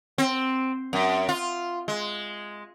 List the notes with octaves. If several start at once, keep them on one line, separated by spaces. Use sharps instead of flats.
C4
F#2
F4
G#3